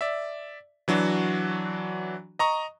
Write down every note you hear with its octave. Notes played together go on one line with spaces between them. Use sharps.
D5 E5
E3 F#3 D4 F#4
D#5 A#5 C#6 D#6